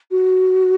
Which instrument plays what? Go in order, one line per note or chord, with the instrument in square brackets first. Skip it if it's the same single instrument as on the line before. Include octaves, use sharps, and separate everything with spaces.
[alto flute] F#4